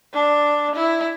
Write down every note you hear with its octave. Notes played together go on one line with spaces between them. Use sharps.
D4
E4